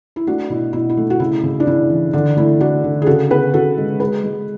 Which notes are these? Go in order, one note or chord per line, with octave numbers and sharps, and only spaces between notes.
E4
A3 D4 F#4
B2 E4
B2 E4
E4
A3
F#4
C#3 E4
C#3
D4
C#3 E4
E3
D3 D4
A3 E4
A3 D4 F#4
D3
G#4
C#3 F#4 A4
B3 G#4 B4
C#3 F#4 A4
G#3
G#3 G#4 B4
G#3